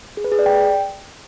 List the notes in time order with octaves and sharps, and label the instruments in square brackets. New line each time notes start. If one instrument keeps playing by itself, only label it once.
[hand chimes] G#4
B4
G#4
D5
G5